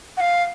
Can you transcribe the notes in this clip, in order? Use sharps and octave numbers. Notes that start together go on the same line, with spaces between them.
F#5
F5